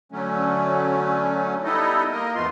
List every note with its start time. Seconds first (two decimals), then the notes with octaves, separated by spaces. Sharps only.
0.12 D3 F#3 A3 C#4
1.64 G3 B3 D#4 E4 A4 D#5
2.11 A#3 A#4 D#5
2.35 E2 G#2 A3 B3 F4 C6